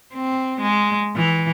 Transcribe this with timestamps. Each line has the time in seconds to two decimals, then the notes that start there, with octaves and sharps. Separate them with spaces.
0.14 C4
0.62 G#3
1.16 E3